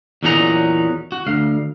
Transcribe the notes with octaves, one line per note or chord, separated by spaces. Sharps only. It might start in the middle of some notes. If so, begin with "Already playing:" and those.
E2 A#2 F#3 C#4 D#4 A#5
F#4
D2 F5